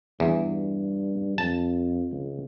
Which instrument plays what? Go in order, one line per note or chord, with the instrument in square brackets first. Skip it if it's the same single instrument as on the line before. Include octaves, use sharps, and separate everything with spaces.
[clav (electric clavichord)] E2 [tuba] G2
[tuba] F2 [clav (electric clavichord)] A5
[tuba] C#2